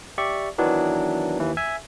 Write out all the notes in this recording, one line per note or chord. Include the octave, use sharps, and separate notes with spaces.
G4 D5 E5 C#6
D#3 E3 F#3 B3 D4 E4
D#2 E3
E5 G#5